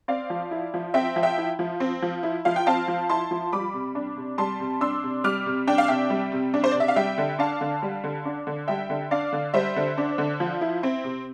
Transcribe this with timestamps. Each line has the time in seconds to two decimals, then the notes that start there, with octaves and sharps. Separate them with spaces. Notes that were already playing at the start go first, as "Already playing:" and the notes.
0.08 C4 D5 F5
0.30 F3
0.51 E4
0.74 F3
0.94 C4 E5 G5
1.16 F3
1.23 E5 G5
1.38 E4
1.59 F3
1.80 C4
2.02 F3
2.23 E4
2.45 F3 F5
2.56 G5
2.67 C4 F5 A5
2.88 F3
3.09 E4 A5 C6
3.31 F3
3.52 G3 B5 D6
3.74 C3
3.95 D4
4.17 C3
4.38 G3 A5 C6
4.60 C3
4.81 D4 C6 E6
5.03 C3
5.24 G3 D6 F6
5.46 C3
5.67 D4 G5
5.78 F5
5.88 C3 E5 G5
6.10 G3
6.32 C3
6.54 D4
6.64 C5
6.72 D5
6.75 C3
6.80 E5
6.88 F5
6.96 G3 E5 G5
7.18 D3
7.39 D4 F5 A5
7.61 D3
7.82 G3
8.04 D3
8.25 D4
8.47 D3
8.68 G3 E5 G5
8.90 D3
9.11 D4 D5 F5
9.32 D3
9.54 G3 C5 E5
9.76 D3
9.98 D4
10.18 D3
10.40 F3
10.61 E4
10.83 C4
11.04 C3